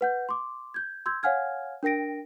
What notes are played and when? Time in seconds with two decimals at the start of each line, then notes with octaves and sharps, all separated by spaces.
0.01 B4 F#5 G6
0.29 C6 D6
0.74 G6 G#6
1.06 C6 E6 G6 G#6
1.23 C#5 F5 F#5 G#5 F6 G#6
1.83 D4 A#4 G5 A#6 D7